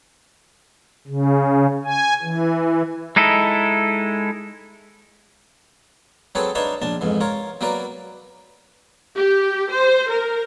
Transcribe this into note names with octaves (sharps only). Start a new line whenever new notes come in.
C#3
G#5
E3
G#3 D#4 E4 A4
F#3 C4 G#4 A4 B4 C#5
D4 D#4 B4 C#5 F5 A5
A#1 D4 A5
F2 G#2 E3
F4 A#4 C#5
F#3 A#3 F#4 A#4 B4 D5
G4
C5
A#4